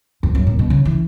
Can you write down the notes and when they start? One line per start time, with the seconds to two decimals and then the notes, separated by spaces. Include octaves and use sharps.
0.23 F2
0.35 F#2
0.47 A#2
0.59 B2
0.70 C#3
0.85 E3